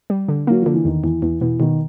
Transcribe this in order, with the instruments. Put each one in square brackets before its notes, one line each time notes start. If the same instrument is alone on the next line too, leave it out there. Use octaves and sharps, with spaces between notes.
[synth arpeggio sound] G3
D3
[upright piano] F#3 [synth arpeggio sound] A#3
[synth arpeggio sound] D3 [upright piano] F3
[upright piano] E3
[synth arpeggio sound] E2 [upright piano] D#3
[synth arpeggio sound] E2 [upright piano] E3
[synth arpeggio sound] E2 [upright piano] E3
[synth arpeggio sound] B2 [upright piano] E3
[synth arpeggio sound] B2 [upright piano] D#3